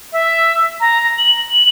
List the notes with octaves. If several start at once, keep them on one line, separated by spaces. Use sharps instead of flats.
E5
A#5
F#7